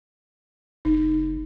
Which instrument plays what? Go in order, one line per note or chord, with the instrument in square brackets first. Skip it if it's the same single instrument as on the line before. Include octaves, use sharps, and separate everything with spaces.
[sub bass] F#1 [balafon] D#4